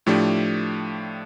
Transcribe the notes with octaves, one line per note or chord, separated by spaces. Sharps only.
A2 F3 A3 D4 G4